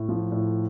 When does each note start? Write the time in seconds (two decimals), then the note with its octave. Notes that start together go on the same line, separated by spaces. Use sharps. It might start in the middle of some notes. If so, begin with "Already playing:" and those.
Already playing: A2
0.09 F3
0.32 A2